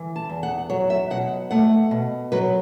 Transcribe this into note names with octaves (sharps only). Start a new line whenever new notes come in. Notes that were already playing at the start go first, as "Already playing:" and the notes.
Already playing: E3
A5
E2
F#5
F#3 C#5
E5
B2 F#5
A3 F#5
B2
F#3 B4